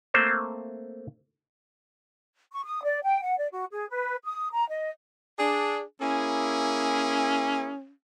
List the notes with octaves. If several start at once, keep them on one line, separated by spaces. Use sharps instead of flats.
A3 A#3 C4 C5
C#6
D#6
D5
G5
F#5
D5
F#4
G#4
B4
D#6
A#5
D#5
D4 G#4
A#3 C#4 E4 G#4